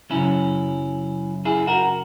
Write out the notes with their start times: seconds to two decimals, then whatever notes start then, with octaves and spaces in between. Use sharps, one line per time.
0.10 F#2 C#3 F#3 C#4 E4
1.45 E4 G#4
1.67 F#4 A#4